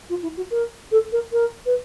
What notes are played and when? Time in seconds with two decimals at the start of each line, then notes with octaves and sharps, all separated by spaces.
0.10 F4
0.23 E4
0.37 F#4
0.51 A#4
0.92 A4
1.12 A#4
1.33 A#4
1.66 B4